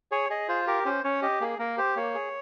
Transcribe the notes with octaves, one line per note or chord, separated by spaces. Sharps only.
G#4 C#5
G#4 D#5
F4 C5
G4 A#4
C#4 C5
C#4 C#5
G4 D#5
A#3 G#4
A#3 A#4
G4 C5
A#3 C#5
G#4